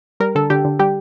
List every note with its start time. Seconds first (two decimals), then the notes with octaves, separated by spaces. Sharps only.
0.20 G3 A#4
0.35 D3 A4
0.50 D3 G4
0.65 D3
0.79 G3 G4